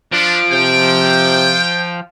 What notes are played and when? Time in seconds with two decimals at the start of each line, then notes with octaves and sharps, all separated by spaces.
0.12 F3 D4 D7
0.51 C3 G5
1.00 G6